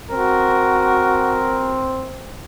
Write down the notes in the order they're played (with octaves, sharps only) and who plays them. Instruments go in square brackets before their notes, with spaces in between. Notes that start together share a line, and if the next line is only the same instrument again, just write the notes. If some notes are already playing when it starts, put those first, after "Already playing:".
[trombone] C4 [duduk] F#4 [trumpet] A#4